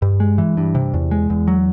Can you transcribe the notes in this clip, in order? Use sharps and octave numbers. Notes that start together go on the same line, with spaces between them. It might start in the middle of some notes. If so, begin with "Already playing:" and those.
G2
G#3
E3
G2
C3
E2
G#3
E2
F#3